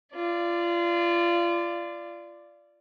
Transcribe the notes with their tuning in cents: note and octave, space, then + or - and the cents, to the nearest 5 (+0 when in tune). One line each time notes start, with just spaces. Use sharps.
F4 -25 D5 +0